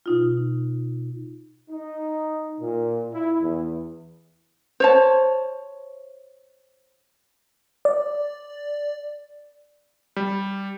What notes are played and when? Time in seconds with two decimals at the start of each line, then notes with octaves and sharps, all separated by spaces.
0.06 B2 D#4 F4
1.70 D#4
2.60 A#2
3.12 E4
3.42 E2
4.80 C5 C#5 A5
7.85 D5
10.16 G3